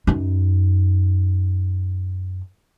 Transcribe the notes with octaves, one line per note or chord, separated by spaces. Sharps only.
F#2 D#4